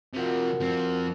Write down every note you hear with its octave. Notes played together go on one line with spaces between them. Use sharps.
C3 F3 F#4 A#4 F#5
F3 C4